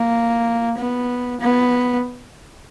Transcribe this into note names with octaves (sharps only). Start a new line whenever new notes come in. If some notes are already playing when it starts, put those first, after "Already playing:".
Already playing: A#3
B3
B3